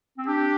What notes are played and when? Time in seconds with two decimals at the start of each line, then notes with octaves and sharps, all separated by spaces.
0.18 C4
0.27 D4 G4